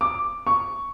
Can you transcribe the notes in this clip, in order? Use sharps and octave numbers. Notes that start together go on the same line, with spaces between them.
D6
C#6